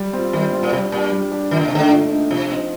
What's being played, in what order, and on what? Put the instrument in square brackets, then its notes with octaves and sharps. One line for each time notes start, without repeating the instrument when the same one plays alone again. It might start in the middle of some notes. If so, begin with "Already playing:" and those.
Already playing: [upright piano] G3
C4 F4
[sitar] D#3 [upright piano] G3
[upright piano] C4 F4
[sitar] A#2
[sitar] C3 [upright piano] G3
[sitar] A#2 [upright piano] D4 G4
[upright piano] G3
D4 G4
[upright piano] A#2 [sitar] D#3
[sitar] D3
C3
[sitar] D3 [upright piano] A3 D#4
[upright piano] A#2
A3 D#4
[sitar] C3 [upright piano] F3
[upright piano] C4 D#4